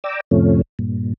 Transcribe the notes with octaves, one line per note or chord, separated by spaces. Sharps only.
D5 G5 A#5 D6 E6
F2 A2 C3 F3 A3 C#4
G2 A#2